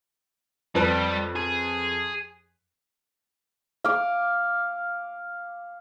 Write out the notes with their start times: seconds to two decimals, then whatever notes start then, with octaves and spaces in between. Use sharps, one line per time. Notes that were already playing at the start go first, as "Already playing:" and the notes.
0.75 F2 G3 B4 A5
1.35 G#4
3.84 F5 D6